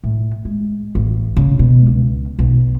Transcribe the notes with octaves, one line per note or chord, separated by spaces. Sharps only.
A2
G#3
A1
C#3
B2
C#2
B1